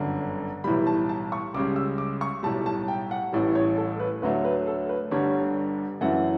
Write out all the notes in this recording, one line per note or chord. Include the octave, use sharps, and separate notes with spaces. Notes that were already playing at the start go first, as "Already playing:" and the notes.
Already playing: G1 F#2 D3
B1 A2 E3 G3 B5
A5
A5
C#6
C#2 C#3 G3 D6
E6
D6
C#6
B1 A2 G3 A5
A5
G5
F#5
A1 A2 E3 G3
C#5
A4
B4
D2 D3 F#3 A3 B4
B4
A4
B4
G1 G2 D3 G3 C#5
F#2 E3 A3 F#5